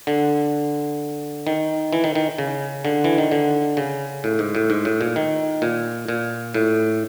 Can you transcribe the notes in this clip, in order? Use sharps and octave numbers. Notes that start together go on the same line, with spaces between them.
D3
D#3
E3
D#3
D#3
C#3
D3
E3
D#3
D3
C#3
A2
G#2
A2
G#2
A2
A#2
D#3
A#2
A#2
A2